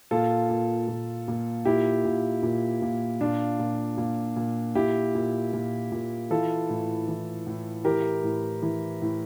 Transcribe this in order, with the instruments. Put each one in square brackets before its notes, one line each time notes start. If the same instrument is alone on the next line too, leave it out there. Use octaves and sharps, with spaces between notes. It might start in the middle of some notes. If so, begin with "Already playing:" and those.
[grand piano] A#2 F4 A4
A#2
A#2
A#2
A#2 E4 G4
A#2
A#2
A#2
A#2 D4 F4
A#2
A#2
A#2
A#2 E4 G4
A#2
A#2
A#2
E3 F4 A4
A2
E3
A2
E3 G4 A#4
A2
E3
A2